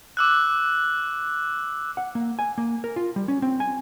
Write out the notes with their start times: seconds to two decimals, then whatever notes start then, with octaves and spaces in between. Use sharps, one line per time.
0.17 D6 E6 F#6
1.97 F#5
2.15 A#3
2.39 G#5
2.58 A#3
2.84 A#4
2.96 F4
3.16 G3
3.28 C#4
3.42 C4
3.60 G#5